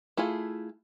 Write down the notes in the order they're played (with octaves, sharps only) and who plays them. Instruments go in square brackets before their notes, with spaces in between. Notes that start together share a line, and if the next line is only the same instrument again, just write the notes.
[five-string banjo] A3 E4 F4 G#4